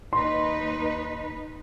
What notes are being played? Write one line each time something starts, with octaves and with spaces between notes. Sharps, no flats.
D#2 D#4 B4 C6